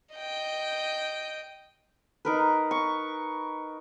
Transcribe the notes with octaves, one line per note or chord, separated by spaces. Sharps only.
D#5 G5
D#4 A#4 B4
C#6